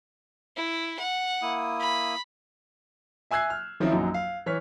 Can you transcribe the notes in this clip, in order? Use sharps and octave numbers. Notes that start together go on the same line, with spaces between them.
E4
F#5
A#3 E4 D#6
B5
E5 G#5 E6 F#6 G#6 C7
F6
D#3 F3 C4 C#4 D#4 E4
A#1 F#2 F#3 D#4
F5
E3 C#5 F6 B6